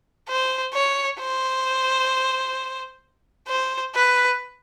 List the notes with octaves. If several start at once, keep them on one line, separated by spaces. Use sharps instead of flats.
C5
C#5
C5
C5
B4